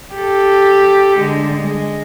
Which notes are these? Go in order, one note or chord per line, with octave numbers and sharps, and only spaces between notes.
G4 A4
D3 G#3
G#3